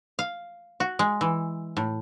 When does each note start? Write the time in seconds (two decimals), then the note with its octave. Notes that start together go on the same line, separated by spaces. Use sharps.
0.19 F5
0.80 F#4
0.99 G#3
1.21 E3
1.77 A2